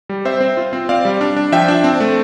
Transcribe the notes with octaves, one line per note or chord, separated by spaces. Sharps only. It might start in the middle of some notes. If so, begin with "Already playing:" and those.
G3
C4 C5 E5
C4
F4
C4
C4 D5 F5
G3
D4
D4
F3 E5 G5
D4
C4
A3